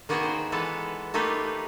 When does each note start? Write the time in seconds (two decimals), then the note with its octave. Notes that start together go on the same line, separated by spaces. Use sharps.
0.09 D#3 A#3 B3 F#4 G#4 G5
0.23 C5
0.52 E3 G#3 B3 A4 B4
1.14 A3 A#3 D#4 F4 G4 B4